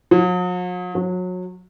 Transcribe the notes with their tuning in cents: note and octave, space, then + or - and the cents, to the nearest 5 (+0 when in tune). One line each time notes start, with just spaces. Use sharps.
F#3 -45
F#3 -25